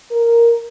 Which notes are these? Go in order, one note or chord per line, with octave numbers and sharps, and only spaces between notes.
A#4